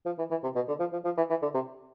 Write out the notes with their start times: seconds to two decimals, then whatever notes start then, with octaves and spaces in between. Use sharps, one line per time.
0.06 F3
0.18 E3
0.31 E3
0.43 C3
0.55 B2
0.68 D3
0.80 F3
0.92 F3
1.05 F3
1.17 E3
1.30 E3
1.42 D3
1.54 C3